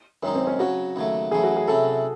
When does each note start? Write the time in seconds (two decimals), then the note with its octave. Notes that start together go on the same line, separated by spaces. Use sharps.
0.23 F#2 D#3 G#3 C#4 D#4
0.35 C4
0.47 C#4
0.59 C#3 F#3 C#4 F#4
0.96 D#2 C#3 F#3 A3
1.31 E2 C#3 F#3 A3 G#4
1.43 F#4
1.57 G#4
1.68 C3 F#3 C#4 E4 A4